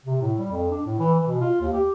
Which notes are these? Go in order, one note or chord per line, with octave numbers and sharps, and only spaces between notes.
C3
A2
G3
F2
D4
A2
E3
E3
B2
F4
D#2
G4